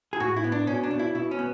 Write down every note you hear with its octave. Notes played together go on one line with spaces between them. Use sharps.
G#4
A2 F#4
E4
B3
D4
B2 C#4
D4
B2
E4
B2 E4
C#4
B3